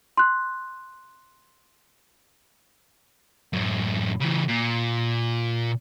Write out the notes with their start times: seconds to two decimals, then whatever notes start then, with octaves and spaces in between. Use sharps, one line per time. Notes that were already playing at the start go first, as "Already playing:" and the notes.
0.17 C6 F#6
3.53 F#2 A2
4.20 C#3 E3
4.48 A#2